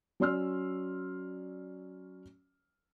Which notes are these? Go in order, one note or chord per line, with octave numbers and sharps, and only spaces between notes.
F#3 C#4 D5 C6 E6 F6